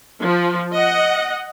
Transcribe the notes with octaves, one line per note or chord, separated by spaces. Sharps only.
F3
D#5 F#5